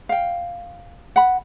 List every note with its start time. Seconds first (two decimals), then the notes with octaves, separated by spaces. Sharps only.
0.09 F5 G5
1.16 F#5 B5